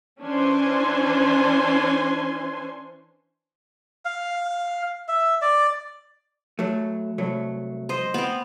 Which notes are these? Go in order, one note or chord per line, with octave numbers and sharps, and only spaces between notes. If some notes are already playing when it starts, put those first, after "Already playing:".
E3 C#4 D4 C5 G#5 C6
F5
E5
D5
F#3 A3
C2 F#3 A3
C5 D#5
B3 C4